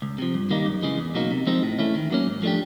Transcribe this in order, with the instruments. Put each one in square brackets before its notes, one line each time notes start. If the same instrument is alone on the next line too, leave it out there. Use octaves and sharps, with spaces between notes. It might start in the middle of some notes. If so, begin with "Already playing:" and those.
[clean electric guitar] C#2
C3 F3
G2
D#3 G3 A#3 D#4
F#2
C#3 E3 G#3
E2
B2 F#3 A#3 D#4
C3
F3 G#3 C4 D#4
A2
E3 A3 C#4 E4
D#3
F#3 A#3 C#4
G#2
F3 A3 D4 G4